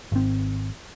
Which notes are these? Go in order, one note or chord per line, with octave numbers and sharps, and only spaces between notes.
G#1 C4